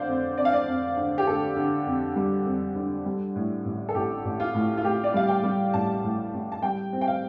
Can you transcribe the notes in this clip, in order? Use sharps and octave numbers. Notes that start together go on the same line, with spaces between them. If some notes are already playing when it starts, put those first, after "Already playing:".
Already playing: D3 C5 D5 F5
F2
F2 D5
F5
D5
F2
D3
G4
D3 A4
D3
F2
G3
F2
D3
G3
A2
A1
A4
A1 G4
A1
F4
A2
F4
A2 G4
D5
G3 F5
G5
G3
A1 A5
A2
A1
A5
G3 G5
C4
G5
F5